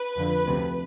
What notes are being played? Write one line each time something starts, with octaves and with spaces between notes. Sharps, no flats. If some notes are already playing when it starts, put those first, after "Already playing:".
Already playing: B4
F2 D3 F3
D2 C3 F3